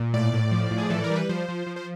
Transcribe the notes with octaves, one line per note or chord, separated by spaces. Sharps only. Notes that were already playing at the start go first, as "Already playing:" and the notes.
Already playing: A#2
A2 D5
A2
F3
A2
G#4
E3 A4
A#4
G3
B4
F3 C5
F3
F3
C5